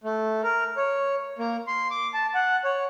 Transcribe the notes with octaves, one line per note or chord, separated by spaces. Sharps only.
A3
A#4
C#5
A#3
C6
D6
A5
F#5
C#5